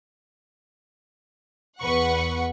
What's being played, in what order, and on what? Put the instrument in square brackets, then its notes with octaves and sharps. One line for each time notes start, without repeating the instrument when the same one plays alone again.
[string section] E2 B4 F#5 C#6